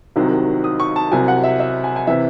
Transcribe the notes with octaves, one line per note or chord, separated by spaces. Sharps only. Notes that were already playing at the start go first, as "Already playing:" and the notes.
C2 C3 D#3 F#3
D#6
C#6
A5
C2 C3 F#3 G#5
F#5
E5
E5
G#5
G#5
C3 E3 E5